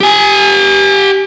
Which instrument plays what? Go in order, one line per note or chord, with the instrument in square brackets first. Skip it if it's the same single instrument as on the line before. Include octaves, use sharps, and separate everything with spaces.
[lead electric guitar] G4 G#5